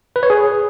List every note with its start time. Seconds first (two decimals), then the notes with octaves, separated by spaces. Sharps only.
0.16 B4
0.23 C#5
0.30 G#4